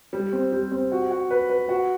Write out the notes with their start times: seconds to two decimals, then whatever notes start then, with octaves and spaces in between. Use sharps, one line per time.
0.13 G3
0.33 C4
0.52 G3
0.72 C4
0.92 F#4
1.11 F#4
1.31 B4
1.49 B4
1.69 F#4